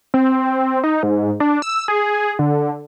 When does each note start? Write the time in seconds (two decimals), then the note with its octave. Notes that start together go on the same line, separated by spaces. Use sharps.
0.14 C4
0.84 D#4
1.03 G#2
1.40 D4
1.62 E6
1.88 G#4
2.39 D3